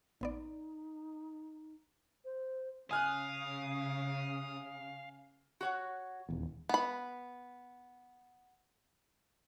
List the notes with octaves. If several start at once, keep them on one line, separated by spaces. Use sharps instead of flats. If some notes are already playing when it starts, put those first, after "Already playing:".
A1 B3 D#4 D5
C5
C#3 F5 G#5 D#6 F6 F#6
F#4 C#5 F#5
D#1 E2
B3 B5